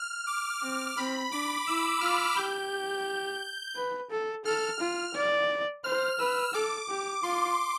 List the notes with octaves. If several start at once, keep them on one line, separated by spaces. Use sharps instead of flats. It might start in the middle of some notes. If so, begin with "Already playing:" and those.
Already playing: F6
D6
C4
C4 B5
D4 D6
E4 E6
F4 F6
G4 G6
B4
A4
A4 F6
F4
D5
C5 F6
B4 E6
A4 D6
G4
F4 C6